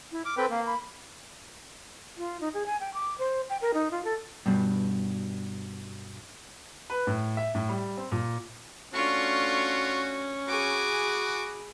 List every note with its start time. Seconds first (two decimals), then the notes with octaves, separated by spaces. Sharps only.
0.12 E4
0.25 D6 F6
0.37 C4 A4 B4 G5
0.50 A#3 F5
0.66 B5
2.17 F4
2.41 D#4
2.54 G#4
2.66 G#5
2.80 G5
2.94 D6
3.19 C5
3.50 G5
3.61 A#4
3.74 D#4
3.91 F4
4.04 A4
4.46 G2 B2 G3
6.90 B4
7.07 A2
7.37 E5
7.55 A2
7.69 G3
7.97 C4
8.12 A#2
8.94 A3 C#4 D4 F4 F#4 C#6
10.48 F#4 G#4 G#5 B5 D6